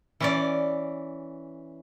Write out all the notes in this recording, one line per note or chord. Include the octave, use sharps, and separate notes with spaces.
E3 C#4 D5